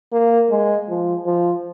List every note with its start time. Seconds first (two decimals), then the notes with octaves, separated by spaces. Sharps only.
0.12 A#3
0.50 G#3
0.88 F3
1.26 F3